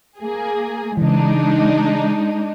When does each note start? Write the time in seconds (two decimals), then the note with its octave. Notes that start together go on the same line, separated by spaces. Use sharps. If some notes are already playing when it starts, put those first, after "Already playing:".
0.19 A#3 G#4
0.97 C#3 E3 G#3 D4 D#4